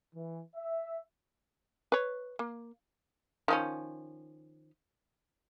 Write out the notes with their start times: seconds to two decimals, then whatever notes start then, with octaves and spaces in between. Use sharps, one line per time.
0.15 E3
0.55 E5
1.92 B4 C#5
2.39 A#3
3.48 D#3 F3 C#4